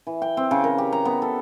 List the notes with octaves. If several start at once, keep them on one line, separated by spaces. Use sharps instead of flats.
E3
G5
C4
C#3
A#4
G4
A#5
B3
A4